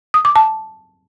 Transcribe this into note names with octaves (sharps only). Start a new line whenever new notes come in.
D#6
D6
A5